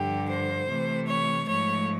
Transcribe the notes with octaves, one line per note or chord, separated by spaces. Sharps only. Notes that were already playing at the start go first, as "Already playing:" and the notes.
Already playing: G2 D3 F3 G4
C5
C3 E3 A3
C#5
G#2 F3 A3 C#5